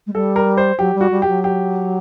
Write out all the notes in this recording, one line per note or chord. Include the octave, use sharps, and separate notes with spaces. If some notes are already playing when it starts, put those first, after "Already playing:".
G#3
G3 A4
A#4
C5
F#3 G4
G3
F#4
G3
G4
F#3
G4